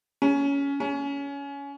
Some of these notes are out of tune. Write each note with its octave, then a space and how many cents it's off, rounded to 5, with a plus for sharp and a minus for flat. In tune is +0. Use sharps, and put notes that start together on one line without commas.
C#4 +15
C#4 +20